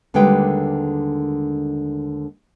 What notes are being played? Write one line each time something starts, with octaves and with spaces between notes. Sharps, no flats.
D#2 D3 G3 G#3 B4 G5